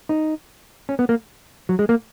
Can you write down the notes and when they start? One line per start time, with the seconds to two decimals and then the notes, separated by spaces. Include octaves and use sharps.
0.09 D#4
0.89 C#4
0.99 B3
1.09 A#3
1.69 F#3
1.79 G#3
1.89 A#3